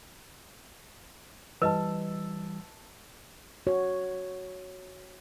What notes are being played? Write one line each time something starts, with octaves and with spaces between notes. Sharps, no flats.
E3 G3 B4 D#5 A5 E6
F#4 C#5